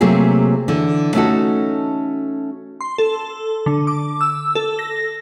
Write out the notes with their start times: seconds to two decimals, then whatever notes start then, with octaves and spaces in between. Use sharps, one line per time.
0.01 C3 F#3 A3 A#3 G#4
0.68 D3 E3
1.15 A3 C#4 D#4 F#4 A4
2.81 C6
2.98 A4
3.66 D3
3.87 D6
4.21 E6
4.55 A4
4.79 A#6